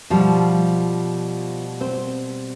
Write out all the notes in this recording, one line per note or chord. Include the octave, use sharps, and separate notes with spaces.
B2 F3 G3 F4
C4 C5